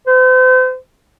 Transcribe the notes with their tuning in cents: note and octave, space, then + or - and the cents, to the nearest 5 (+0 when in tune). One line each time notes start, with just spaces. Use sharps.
C5 -40